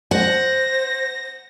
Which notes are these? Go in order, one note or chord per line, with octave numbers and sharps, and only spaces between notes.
C5 F#5 A#6